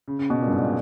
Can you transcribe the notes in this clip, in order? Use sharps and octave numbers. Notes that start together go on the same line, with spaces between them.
C#3
C#3
B2
A#2
G2
G#2
A#2